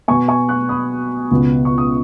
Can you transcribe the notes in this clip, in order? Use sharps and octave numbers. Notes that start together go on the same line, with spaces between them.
B2 B3 G#5 C#6
G#5 C#6
C#6 F#6
B5 D#6
C#2 B2 B3
C#6
D#6